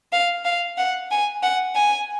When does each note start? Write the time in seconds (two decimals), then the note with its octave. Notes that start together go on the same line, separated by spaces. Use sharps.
0.13 F5
0.45 F5
0.78 F#5
1.11 G#5
1.43 F#5
1.76 G#5